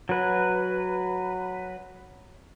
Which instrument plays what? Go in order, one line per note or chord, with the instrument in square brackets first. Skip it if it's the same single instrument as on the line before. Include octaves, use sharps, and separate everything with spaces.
[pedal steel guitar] F#3 B4